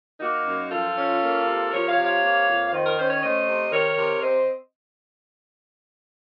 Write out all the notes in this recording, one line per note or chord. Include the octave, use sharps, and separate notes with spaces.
A#3 D#4 F#4
F#2
F3 F4 A4
C#4
A#3
C3
F3 A#4 C#5
C#5 F5
C3
C#5 F5
A#3
F2
F5
D#3 C5 D#5
A#4
C#4 C5
C#5
A3 C5 D#5
C3
D#3 A#4 C#5
C3
C4 C5 D#5